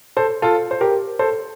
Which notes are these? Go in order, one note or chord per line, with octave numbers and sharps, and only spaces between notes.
A4 C5
F4 A4
C5
G4 A#4
A4 C5